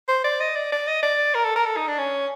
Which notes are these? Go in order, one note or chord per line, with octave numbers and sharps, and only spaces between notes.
C5
D5
D#5
D5
D5
D#5
D5
A#4
A4
A#4
A4
D#4
D4
C#4